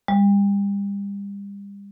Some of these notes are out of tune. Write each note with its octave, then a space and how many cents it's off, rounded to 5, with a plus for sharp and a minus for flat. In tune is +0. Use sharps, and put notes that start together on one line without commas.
G3 +35